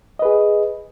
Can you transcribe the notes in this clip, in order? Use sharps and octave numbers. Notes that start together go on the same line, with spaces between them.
G#4 B4 D#5